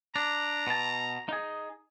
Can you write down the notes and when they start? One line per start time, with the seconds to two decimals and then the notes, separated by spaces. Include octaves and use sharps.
0.16 D4 A#5
0.67 B2 A5
1.29 D#4 G#4